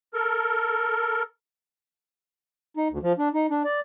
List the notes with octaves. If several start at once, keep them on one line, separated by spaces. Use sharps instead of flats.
A4 A#4
D#4
D2
F3
D4
D#4
D4
D5